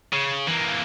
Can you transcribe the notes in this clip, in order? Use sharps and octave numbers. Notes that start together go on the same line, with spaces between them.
C#3
E3 A#3